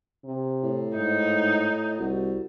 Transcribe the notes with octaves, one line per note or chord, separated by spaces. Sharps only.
C3
A2
G#2 D#4
C2 F#4